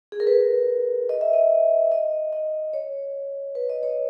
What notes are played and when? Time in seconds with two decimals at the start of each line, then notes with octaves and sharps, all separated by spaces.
0.12 G#4
0.20 A#4
0.27 B4
1.09 D#5
1.21 E5
1.33 D#5
1.92 D#5
2.33 D#5
2.73 C#5
3.55 B4
3.70 D#5
3.83 C#5